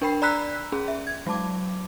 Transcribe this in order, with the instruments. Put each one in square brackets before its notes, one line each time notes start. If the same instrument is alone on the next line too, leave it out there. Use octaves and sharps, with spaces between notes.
[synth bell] D4 A#4 G5 B5 C7
D5 A#5 B5 E6 F#6 B6
C#4 G#4
E5
G#6
F#3 G#3 A5 D6